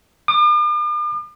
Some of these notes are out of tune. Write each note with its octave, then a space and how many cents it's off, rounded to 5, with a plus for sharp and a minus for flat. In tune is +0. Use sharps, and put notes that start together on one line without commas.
D6 +45